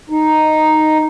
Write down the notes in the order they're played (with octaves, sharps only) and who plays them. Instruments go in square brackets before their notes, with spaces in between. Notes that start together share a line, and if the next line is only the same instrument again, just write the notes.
[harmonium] D#4